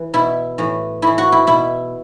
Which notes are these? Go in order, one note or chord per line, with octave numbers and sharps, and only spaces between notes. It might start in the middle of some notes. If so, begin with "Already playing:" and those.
Already playing: E3
B2 E4
A2 E3
A2 E3 E4
F#4
E4
B2 E4